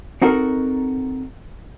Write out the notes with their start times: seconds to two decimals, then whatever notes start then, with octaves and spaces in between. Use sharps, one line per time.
0.22 C4 D#4 F#4 A4 A#4